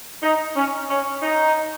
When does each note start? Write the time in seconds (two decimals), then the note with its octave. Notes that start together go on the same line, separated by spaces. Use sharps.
0.22 D#4
0.55 C#4
0.89 C#4
1.22 D#4